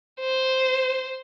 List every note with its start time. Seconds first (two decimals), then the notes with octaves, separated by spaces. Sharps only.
0.20 C5